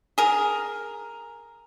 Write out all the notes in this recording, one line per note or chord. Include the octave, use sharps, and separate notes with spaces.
G#4 A#4